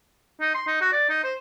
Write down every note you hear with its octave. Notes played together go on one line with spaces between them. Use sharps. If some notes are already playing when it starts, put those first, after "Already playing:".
D#4
C6
D#4
F#4
D5
D#4
C5